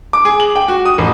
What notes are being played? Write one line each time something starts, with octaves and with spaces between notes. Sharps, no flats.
D6
G#4
F#7
G5
F#4
D#6
A1